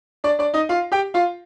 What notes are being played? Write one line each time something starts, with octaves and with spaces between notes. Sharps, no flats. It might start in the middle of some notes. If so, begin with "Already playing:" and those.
D4 D5
D4 D5
D#4 D#5
F4 F5
G4 G5
F4 F5